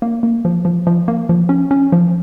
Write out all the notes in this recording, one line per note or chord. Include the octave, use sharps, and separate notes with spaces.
A#3
A#3
F3
F3
F3
A#3
F3
C#4
C#4
F3